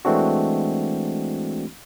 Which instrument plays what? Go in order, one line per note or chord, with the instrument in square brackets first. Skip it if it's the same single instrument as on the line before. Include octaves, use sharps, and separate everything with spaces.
[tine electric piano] E3 G#3 A3 C4 D4 F#4